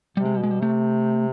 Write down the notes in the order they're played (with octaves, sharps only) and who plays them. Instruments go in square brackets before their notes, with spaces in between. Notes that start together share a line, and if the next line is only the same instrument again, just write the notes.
[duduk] C3 [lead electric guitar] G3
[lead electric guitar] G#3
G3
[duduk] B2 [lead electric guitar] G#3
[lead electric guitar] G3
[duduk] C3 [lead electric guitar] A3